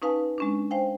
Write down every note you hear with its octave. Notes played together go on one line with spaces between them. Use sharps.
C#4 D#4 B4 F5 G#5 A5
G#3 C#4 D4
C5 F5 G5 G#5